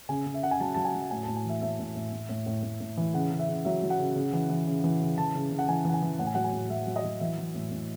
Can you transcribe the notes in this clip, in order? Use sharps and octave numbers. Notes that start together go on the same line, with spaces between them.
C#3 G#5
C#3
E5
C#3 F#5
G#5
F#3 A5
F#3 A5
G#5
F#3
F#5
A2 G#5
A2 A5
G#5
E3 E5
A2 E5
A2
A2
A2
A2
A2
A2
A2
E3
C#3 F#5
C#3
E5
C#3
F#3 E5
F#3
F#5
C#3
C#3
E3
E3
C#3
E3
C#3
E3 A5
C#3
C#3
F#5
E3 G#5
E3 F#5
G#5
E3
A2 F#5
G#5
F#3 F#5
G#5
A2
F#3 E5
F#3
D#5
F#3
E3 E5
E3
A2
A2